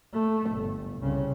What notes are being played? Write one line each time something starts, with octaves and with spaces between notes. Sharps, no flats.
A3
G1
C2 C#3